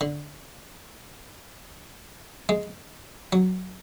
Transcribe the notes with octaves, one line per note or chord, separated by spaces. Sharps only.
D3
G#3
F#3